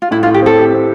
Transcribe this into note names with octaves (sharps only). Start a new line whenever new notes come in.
F4
A2 E4
F4
A2
G4
C4 A4
G4
C4